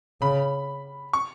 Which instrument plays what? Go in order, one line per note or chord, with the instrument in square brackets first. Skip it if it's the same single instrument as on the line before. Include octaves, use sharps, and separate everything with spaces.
[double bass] C#3 [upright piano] B5
[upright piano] C#6